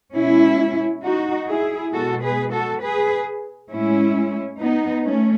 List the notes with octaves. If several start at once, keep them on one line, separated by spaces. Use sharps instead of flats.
B2 G#3 C#4 E4
D#4 F#4
E4 G#4
B2 G#3 F#4 A4
G#4 B4
F#4 A4
G#4 B4
A2 G#3 C#4 E4
B3 D#4
A3 C#4